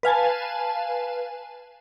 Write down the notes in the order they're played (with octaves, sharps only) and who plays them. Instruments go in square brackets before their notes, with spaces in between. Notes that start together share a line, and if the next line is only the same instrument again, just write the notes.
[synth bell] B4 F5 G#5 A5